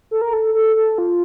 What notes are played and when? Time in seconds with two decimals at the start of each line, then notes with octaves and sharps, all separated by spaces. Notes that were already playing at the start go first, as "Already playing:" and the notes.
0.11 A4
0.22 A#4
0.33 A4
0.54 A4
0.76 A4
0.98 F4